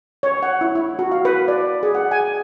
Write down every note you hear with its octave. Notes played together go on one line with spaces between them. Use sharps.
C#5
F#5
E4
E4
F#4
F5
B4
D5
G#4
F#5
G#5